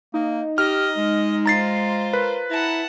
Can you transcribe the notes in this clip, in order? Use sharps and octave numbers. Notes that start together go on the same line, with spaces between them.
A#3 D#4
G4 D#5 F6
G#3
F4 C5 A#5 A6 C7
A#4 B4
E4 F#5 A5 A#5